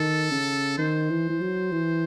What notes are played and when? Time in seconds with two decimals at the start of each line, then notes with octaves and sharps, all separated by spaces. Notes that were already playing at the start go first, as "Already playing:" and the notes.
Already playing: D#3 A4
0.31 C#3
0.78 D#3 C5
1.10 E3
1.30 E3
1.41 F#3
1.72 E3